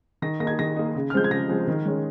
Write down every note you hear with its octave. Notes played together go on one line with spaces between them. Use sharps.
D#3 A#6
A#3 D#4 G#6 A#6
D#3 A#6
A#3 D#4
C#3
F6
F3 G#3 C4 G6
G#6
C#3 A#6
F3 G#3 C4
D#3
G#3 C#4